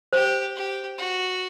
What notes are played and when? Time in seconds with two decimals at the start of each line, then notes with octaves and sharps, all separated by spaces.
0.13 G4 C5
0.55 G4
0.98 F#4